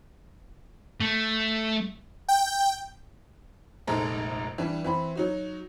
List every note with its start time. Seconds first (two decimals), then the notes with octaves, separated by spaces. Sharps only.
1.00 A3
2.28 G5
3.87 F1 A#1 G#3 D#4 A4 A#5
4.58 E3 G3 D4
4.84 E3 C4 B5
5.15 F#3 D#4 F#4